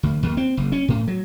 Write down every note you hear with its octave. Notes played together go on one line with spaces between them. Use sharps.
D2
D#2
C4
F#1
C#4
A2
F#3